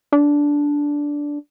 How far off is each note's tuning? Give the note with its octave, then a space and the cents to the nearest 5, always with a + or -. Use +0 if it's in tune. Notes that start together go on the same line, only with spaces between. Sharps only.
D4 -10